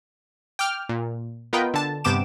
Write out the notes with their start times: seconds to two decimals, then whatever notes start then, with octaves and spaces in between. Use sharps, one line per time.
0.59 G5 D6 F6
0.89 A#2
1.53 B3 F4 A#4 B4 D#5 G5
1.74 D3 A5
2.04 G2 C3 B3 G5 D6 E7